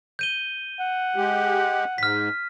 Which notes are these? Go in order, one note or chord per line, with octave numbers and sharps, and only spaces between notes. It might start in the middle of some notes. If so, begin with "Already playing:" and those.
G6 D#7 G7
F#5
G#3 G4
G#2 F6 B6